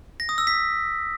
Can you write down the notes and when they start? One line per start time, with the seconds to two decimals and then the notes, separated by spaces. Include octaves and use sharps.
0.20 A#6
0.29 D#6
0.38 E6
0.47 B6